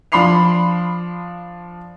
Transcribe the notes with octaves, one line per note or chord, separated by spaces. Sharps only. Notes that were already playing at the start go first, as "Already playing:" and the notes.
F3 D4 B5 C6 C7 F7